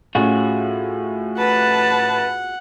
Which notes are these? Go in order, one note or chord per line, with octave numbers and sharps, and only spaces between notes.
A2 C#4 F4 F#4 G#4
B4 F#5 A5